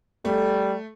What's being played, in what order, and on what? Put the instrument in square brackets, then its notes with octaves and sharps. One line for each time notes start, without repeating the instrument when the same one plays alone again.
[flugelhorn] G3 [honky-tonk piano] A3